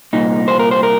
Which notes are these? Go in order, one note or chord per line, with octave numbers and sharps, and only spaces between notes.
C2 A#2 D#4
C5
A#4
C5
A#4